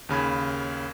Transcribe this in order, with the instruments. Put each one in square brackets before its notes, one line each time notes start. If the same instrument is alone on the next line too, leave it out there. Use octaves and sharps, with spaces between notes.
[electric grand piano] D#2 C#3 B5 G#6